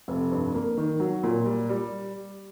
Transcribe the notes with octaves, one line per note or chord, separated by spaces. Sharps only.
F1
G2
A#3
D#3
F#3
A#2
G3
G3